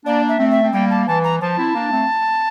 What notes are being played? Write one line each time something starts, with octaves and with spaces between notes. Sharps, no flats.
A#3 D4 D5
E5
A3 C4
E5
C4
G3 A#3 G5
A5
E3 A5
A#5
F3 A5
C4 E4
A#3 D4
A3 C4